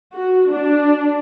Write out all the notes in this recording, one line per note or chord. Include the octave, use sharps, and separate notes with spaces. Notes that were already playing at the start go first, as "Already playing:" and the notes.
F#4
D4